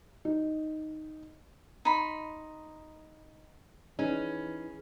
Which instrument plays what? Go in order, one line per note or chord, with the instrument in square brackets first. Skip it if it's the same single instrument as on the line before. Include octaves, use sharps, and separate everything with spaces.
[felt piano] D#4
[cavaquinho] D#4 B5 C6
[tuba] E3 [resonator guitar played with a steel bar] C#4 [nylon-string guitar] D#4 [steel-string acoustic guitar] G#4 B4